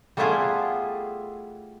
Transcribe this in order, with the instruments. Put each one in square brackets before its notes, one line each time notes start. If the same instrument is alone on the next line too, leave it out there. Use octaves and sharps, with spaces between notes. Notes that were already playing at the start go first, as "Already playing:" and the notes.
[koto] G3 A3 B3 E4 F4 G#4